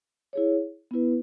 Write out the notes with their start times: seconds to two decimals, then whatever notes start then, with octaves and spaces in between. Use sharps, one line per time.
0.33 E4 G#4 C#5
0.91 B3 E4 B4